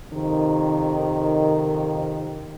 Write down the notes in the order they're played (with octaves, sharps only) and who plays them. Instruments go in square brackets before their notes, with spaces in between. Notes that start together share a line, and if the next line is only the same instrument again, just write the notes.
[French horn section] F2 C3 D#3